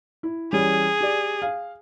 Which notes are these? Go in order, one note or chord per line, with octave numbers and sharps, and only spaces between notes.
E4
E3 G3 C#4 G#4
G4 D5
F5